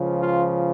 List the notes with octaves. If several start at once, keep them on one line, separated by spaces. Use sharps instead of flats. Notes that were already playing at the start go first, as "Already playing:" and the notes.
Already playing: C#2 C#3 F3
F4